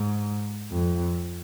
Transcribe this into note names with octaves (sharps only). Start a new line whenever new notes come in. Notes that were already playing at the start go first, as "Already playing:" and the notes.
Already playing: G#2
F2